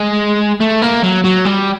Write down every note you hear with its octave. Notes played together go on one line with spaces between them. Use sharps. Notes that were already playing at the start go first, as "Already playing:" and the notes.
Already playing: G#3
A3
A#3
F#3
F#3
G3